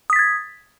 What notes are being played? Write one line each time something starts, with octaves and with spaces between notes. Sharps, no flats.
D#6 G#6 A6 B6